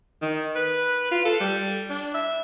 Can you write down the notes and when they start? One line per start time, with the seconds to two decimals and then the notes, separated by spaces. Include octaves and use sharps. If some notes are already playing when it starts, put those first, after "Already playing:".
0.22 D#3
0.56 B4
1.11 F4
1.25 A4
1.41 G3
1.90 D4
2.14 E5